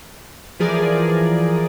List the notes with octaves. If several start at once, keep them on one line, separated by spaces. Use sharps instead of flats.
E3 F3 G#4 A#4 D5